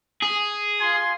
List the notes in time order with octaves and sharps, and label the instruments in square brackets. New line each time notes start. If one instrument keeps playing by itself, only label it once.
[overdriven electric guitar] G#4
[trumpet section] F4 G#5 C6